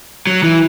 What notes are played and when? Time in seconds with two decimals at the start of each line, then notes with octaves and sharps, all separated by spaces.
0.27 F#3
0.43 E3